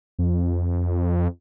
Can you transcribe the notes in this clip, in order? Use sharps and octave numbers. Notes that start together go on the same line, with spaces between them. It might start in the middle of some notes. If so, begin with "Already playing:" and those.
F2